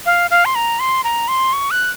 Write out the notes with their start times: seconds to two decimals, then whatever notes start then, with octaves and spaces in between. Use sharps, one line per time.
0.06 F5
0.31 F5
0.45 C6
0.55 A#5
0.80 C6
1.04 A#5
1.28 C6
1.53 C#6
1.71 F#6